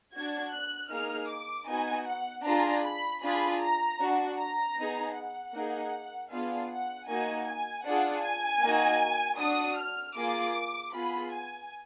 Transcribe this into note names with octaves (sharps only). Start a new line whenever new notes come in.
D4 F#4 G#6
F#6
A#3 D#4 G#4 F6
D6
B3 D#4 F#4 G#5
F#5
D4 F4 G#4 A#5
B5
D4 F4 G#4 B5
A#5
D4 F#4
A#5
B3 D#4 G#4
F#5
A#3 D#4 G#4
B3 D4 F4 G#4 F5
F#5
A#3 D#4 F#4 G#5
G#5
D4 F4 G#4 F#5
G#5
A#3 D#4 F#4
D4 F#4 D#6
F6
A#3 F4 G#4 D6
B3 F4 G#4 B5
G#5